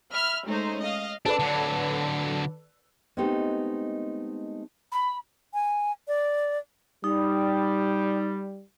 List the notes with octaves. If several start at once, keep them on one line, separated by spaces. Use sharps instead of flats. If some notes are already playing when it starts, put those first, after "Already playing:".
E5 B5 F6
G#3 A3 C#4 D#4 C5
D#5 F5
D4 A4 B4 D5
D3 F#3
G#3 A3 B3 C4 D#4 G4
B5
G#5
D5
G3 D#4